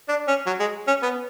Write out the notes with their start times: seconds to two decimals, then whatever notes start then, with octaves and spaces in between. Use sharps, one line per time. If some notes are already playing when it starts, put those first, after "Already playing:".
0.09 D4
0.28 C#4
0.46 F#3
0.60 G#3
0.87 C#4
1.02 B3